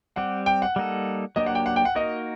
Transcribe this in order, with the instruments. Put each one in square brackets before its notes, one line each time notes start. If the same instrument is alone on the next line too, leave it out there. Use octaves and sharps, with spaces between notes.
[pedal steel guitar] G3 C4 G4 [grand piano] F#5
[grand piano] G5
F#5
[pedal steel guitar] G3 A#3 D#4 A4
[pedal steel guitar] F#3 A#3 D4 G4 [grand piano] D#5
[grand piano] F#5
G5
F#5
G5
F#5
[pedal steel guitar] A#3 D#4 F#4 A#4 [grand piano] D#5